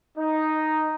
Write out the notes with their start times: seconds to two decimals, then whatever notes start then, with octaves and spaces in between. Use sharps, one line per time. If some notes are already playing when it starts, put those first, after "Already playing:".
0.17 D#4